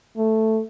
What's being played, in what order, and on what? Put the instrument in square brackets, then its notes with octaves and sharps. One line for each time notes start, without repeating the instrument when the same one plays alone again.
[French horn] A3